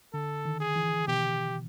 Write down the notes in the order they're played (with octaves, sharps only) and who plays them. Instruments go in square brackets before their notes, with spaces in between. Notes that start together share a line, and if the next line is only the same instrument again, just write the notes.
[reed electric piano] D3 [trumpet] A4
[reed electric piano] D#3
[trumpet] G#4
[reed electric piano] E3
[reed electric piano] B2 [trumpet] G4